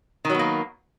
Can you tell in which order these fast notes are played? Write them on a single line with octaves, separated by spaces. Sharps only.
D#3 F#3 B3 A#3